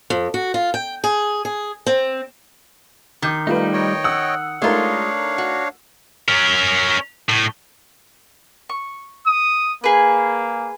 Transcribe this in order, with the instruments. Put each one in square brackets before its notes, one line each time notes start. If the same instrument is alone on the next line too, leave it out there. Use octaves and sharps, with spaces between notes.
[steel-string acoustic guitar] F2
F#4
F4
G5
G#4
G#4
C4
[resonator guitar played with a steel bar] D#3 [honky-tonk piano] D6 G6
[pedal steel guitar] G3 D#4 [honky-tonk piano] A3 F4 B4
[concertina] C#5 D#5 G5
[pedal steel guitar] F#5 [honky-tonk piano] D#6 E6
[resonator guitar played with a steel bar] G#3 F4 [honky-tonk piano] A3 D#4 A#4 [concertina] D4 C#5 F5
[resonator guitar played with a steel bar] F#4
[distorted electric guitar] C#4 A#4
A2
[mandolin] C#6
[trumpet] D#6
[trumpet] A#3 [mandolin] G#4 B4